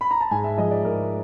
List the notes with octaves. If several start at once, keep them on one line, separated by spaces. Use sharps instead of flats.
B5
A#5
A5
G#2 G#5
E5
F3 G#3 D#5
D5
G#2 A#4